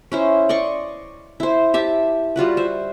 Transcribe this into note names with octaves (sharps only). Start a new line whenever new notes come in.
C#4 E4 C5
D5 D#5 C6 C#6
E4 C5
G4 E5 A5
G3 F4 F#4 B4
C5 E5